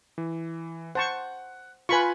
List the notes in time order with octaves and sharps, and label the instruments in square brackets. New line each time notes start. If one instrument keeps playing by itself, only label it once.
[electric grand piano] E3
[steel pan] C5 A5 C#6 [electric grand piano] F#5
[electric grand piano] F4 G#5 [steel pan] B4 B5 C#6